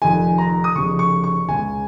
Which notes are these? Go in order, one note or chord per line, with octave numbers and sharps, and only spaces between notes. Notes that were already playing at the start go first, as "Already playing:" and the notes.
F1 F2 D#3 G#5
A#5
D#6
F1 F2 C#3 C#6
C#6
C#6
C#2 C#3 G#5